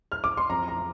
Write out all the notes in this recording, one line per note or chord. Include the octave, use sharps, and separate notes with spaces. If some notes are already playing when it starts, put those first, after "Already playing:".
F6
D6
C6
F2 A#5
A#5